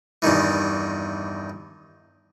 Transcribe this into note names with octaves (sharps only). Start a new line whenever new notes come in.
E2 G2 D#3 E3